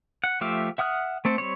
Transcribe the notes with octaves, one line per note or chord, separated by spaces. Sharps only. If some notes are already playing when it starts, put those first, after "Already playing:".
F#5
F3 A3 G4 E5 F5
E5 F#5 D#6 F6 F#6
A3 C4 A4
G3 C4 C#5